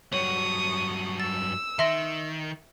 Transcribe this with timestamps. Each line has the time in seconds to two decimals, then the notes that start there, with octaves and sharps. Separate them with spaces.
0.13 G2 F#3 C#5 C#6 D#6
1.20 E6 A6
1.79 D#3 E5 C6 A#6